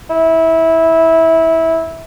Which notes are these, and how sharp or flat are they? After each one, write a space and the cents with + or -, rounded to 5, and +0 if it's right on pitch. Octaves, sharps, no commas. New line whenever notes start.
E4 -15